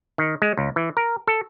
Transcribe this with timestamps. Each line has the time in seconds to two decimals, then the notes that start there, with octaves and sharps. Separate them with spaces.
0.18 D#3
0.42 G#3
0.57 C#2
0.76 E3
0.97 A#4
1.27 A4